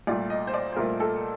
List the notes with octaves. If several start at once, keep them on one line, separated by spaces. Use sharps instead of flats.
C2 A#2 A3 D5
D#5
C5
D5
C5
C2 A#2 A3 A#4
A4